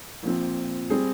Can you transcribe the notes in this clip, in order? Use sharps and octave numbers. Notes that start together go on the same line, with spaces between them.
A#1 A#2 F3 C4
G3 C4 G#4